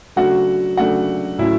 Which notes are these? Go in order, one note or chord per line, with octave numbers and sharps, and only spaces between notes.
C#3 F#3 A3 D4 F#4 F#5
C#3 F#3 A3 D4 F#4 F#5
A2 F#3 C#4 E4 E5